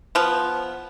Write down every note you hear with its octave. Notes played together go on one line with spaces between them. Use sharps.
F3 B3